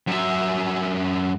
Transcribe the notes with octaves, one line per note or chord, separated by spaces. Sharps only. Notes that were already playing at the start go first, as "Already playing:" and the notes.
F#2 E5